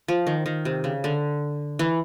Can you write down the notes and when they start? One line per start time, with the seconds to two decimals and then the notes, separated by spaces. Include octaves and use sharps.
0.08 F3
0.27 D#3
0.46 D#3
0.65 C3
0.84 C#3
1.04 D3
1.79 E3